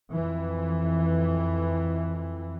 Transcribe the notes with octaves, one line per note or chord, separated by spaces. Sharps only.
F2 E3